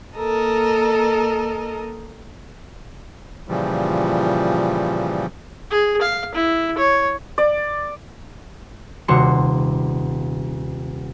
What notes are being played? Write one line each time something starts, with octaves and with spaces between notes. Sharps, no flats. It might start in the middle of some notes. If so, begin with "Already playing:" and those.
A#3 A4 A#4 D#5
A#2 C#3 E3 F3 G3
G#4
F5
E4
C#5
D5
D#1 C3 F#4 C6 C#7